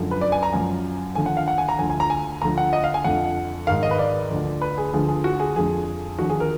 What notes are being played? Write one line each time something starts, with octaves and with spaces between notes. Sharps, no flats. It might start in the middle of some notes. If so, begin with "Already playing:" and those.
Already playing: F#2 D3 F3
B4
D5
G#5
A#5
F#2 F3 G#5
D#2 D3 F3 G#5
F#5
F5
F#5
G#5
A#5
D2 D3 F3 G#5
G#5
A#5
G#5
D2 D3 F3 A#5
F#5
D#5
F5
G#5
F2 D3 F3 F#5
G#2 D#3 F5
D#5
B4
D5
D2 D3 F3
B4
G#4
D2 D3 F3 G#4
G#4
F#4
G#4
F2 D3 F3 G#4
D#2 D3 F3 F#4
G#4
A#4